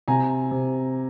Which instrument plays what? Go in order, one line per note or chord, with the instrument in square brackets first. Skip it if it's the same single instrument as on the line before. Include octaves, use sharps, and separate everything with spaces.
[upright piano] C3 G#5 A#5
C3